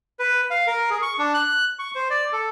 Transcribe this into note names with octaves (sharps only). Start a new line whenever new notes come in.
B4
F5
A#4
G#4
C#6
D4
F#6
C#6
C5
D5
A4